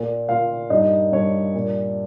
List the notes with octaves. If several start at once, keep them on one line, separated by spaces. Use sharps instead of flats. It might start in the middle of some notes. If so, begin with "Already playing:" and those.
Already playing: A#2
A#2 F4 F5
G2 D#4 D#5
G2 C#5
A#2